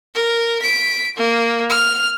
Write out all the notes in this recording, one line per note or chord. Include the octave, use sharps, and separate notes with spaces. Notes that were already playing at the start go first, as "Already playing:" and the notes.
A#4
B6 D7
A#3
F6